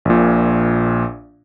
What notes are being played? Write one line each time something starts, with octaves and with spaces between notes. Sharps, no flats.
A#1 A#2